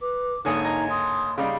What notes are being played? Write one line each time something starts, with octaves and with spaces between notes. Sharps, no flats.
B4 D6
G#1 D3 A#3 D#4 C#5 G#5 D#6
D#5 A#5 G#6
C6 D#6
C#3 G3 D#4 F5